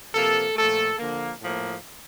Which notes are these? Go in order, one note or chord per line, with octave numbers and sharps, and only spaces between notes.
C3 F3 A#3 A4
A#2 F3 A3 A4
D3 F3 A#3
A2 F3 A#3